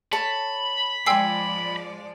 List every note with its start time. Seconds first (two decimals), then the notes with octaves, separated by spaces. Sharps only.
0.12 A4 C#5 A5 B5
1.06 F3 G#3 D5 G5 G#5 C6 E6 C7